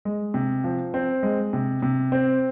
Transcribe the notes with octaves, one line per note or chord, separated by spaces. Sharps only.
G#3
C3
F3
C4
G#3
C3
C3
C4